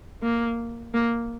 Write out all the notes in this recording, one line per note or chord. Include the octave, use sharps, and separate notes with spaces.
A#3
A#3